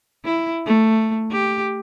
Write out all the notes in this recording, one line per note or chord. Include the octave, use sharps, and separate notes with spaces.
E4
A3
G4